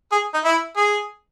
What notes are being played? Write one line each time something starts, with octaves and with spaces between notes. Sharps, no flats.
G#4
D#4
E4
G#4